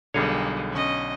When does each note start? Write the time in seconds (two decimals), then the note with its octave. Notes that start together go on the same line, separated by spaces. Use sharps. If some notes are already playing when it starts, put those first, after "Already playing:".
0.14 B1 D3 G3 G#3 A#3 G#4 C#5
0.71 C#4 D#5